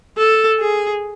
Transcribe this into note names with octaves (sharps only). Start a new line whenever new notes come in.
A4
G#4